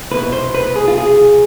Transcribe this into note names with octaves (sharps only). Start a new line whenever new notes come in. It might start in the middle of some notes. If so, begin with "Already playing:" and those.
C2 B2 B4
C5
B4
G#4
F4
G#4